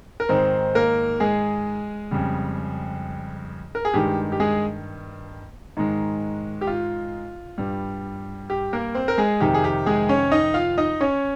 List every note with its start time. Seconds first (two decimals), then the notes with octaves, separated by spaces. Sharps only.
0.20 A#4
0.29 G#2 D#3 G#3 C4 C5
0.75 A#3 A#4
1.20 G#3 G#4
2.11 F2 C#3 G3
3.75 A#4
3.85 G#4
3.94 G2 D#3 G#3 G4
4.32 G4
4.40 G#3 G#4
5.77 G#2 D#3 G#3
6.61 G4
6.67 F4
7.58 G2 G3
8.50 G4
8.73 A#3 A#4
8.95 C4 C5
9.08 A#4
9.18 G#3 G#4
9.40 F2 C3 D#3 G4
9.54 G#4
9.64 G4
9.86 G#3 G#4
10.09 C#4 C#5
10.32 D#4 D#5
10.54 F4 F5
10.78 D#4 D#5
11.01 C#4 C#5